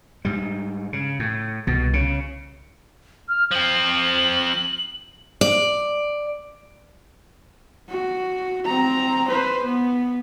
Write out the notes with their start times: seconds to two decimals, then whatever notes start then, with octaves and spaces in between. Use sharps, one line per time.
0.25 G#2 G3
0.93 C#3
1.19 A2
1.67 C2 B2
1.93 C#3
3.29 F6
3.51 F3 C4 F#7
5.41 D5
7.89 F#4
8.66 C4 A#5
9.29 B4 C5
9.64 B3